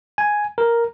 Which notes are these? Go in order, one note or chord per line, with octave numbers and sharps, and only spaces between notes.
G#5
A#4